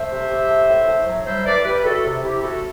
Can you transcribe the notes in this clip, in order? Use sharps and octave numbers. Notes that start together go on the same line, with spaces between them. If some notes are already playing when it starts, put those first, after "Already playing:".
Already playing: A3 C5 E5
C3
C3
A3
A2
A2
F#3
G3 C5 E5
A2 B4 D5
G3 G4 B4
A2 F#4 A4
C3
C3 E4 G4
A3 F#4 A4